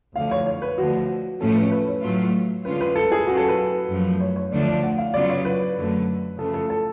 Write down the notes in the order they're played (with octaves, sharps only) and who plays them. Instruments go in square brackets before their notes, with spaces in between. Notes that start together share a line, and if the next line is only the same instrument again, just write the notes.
[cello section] D2 D3 F3 [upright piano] F5
[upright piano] C#5
C#5
B4
[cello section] D2 D3 F3 [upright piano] F#4
[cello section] A2 F3 A3 C#4 [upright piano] A4
[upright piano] B4
B4
C#5
[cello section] A2 F#3 A3 F4
[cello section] D3 G#3 C#4 F4 [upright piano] B4
[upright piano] B4
A4
G#4
[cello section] B2 F#3 C#4 F4 [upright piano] F#4
[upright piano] A4
B4
[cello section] F#2 F3 A3
[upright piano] C#5
C#5
[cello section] D2 D3 F3 A3 D4 [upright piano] D5
[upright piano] D5
F#5
F5
[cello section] C#3 F#3 B3 F4 [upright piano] D5
[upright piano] C#5
B4
[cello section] F#2 D3 F#3 A3
[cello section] C#3 F3 A3 [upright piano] A4
[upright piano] A4
A4